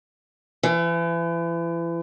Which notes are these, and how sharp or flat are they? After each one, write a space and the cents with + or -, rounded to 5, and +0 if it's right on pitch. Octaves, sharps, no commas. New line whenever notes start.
E3 +35